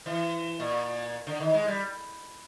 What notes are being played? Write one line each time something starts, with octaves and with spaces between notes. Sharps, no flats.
E3
A#2
D3
D#3
G#3
G3